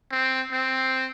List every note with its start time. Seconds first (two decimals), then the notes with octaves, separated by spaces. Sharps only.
0.11 C4
0.52 C4